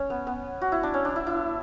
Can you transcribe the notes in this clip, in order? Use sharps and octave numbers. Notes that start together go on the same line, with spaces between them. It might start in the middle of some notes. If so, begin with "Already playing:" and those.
Already playing: C#4
B3
B3
F#4
E4
D4
C#4
D4
E4
E4